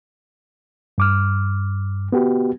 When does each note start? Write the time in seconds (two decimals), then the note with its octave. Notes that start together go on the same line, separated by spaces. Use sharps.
0.98 G2 D6 F6
2.12 B3 F#4 G4